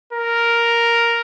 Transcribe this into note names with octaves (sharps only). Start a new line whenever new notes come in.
A#4